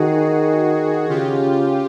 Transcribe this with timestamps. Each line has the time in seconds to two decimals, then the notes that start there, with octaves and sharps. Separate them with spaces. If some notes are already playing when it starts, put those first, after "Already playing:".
Already playing: D#3 F#4 G#4
1.10 C#3 F4 G4